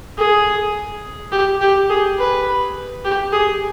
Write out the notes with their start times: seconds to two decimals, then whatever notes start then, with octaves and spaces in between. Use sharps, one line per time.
0.18 G#4
1.32 G4
1.61 G4
1.90 G#4
2.19 B4
3.05 G4
3.33 G#4